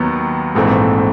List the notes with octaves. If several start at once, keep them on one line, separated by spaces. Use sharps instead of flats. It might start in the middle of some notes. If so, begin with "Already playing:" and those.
Already playing: D#2 D#3 F#3 B3
A#1 G#2 E3 A3 C4